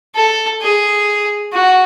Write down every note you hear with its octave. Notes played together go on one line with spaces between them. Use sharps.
A4
G#4
F#4